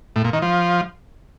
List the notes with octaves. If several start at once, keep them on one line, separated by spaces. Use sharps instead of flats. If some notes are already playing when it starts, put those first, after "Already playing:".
A2
A#2
D#3
F3